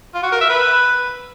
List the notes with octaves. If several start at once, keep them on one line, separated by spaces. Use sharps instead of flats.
F4
F#4
A#4
E5
B4